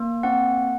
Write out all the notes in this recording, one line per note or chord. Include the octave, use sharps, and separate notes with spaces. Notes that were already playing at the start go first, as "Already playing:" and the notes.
Already playing: A#3
C4 F#5